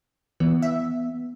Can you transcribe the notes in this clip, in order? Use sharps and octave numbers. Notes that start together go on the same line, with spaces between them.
E3 B3
E5